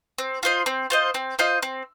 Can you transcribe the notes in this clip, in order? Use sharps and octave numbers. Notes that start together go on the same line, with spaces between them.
C4
F4 C5 D#5
C4
F4 C5 D#5
C4
F4 C5 D#5
C4